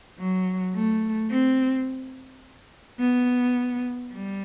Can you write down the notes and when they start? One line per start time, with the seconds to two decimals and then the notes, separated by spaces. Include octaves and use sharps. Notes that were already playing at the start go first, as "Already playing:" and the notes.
0.18 F#3
0.74 A3
1.30 C4
3.00 B3
4.12 G3